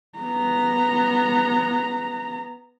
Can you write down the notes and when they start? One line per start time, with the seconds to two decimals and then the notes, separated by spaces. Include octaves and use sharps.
0.19 B3 A#5